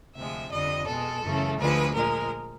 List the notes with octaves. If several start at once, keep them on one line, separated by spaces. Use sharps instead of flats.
D2 C3 F3 G#3 E5
F2 D3 G3 D#5
B2 G#3 A4
F#2 C#3 E3 A3
D2 D3 F3 G#3 B4
A#2 F3 G#3 A#4